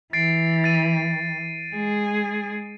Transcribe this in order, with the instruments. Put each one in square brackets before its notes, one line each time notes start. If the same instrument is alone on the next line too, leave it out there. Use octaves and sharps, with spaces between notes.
[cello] E3 [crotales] A6 C7 D7
[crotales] A6 D#7
[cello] G#3 G#4